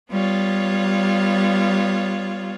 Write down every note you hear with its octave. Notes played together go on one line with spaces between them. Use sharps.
G3 B3 F4 C#5